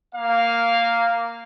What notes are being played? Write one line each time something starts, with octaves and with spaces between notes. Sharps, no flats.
A#3 F5